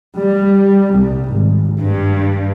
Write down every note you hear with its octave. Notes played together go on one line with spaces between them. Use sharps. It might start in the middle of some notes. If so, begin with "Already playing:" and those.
G3
C2
G#1
G2